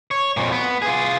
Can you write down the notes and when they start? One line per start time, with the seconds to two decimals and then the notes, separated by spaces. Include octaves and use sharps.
0.11 C#5
0.37 F2 A#2
0.52 B3
0.82 F4 G#4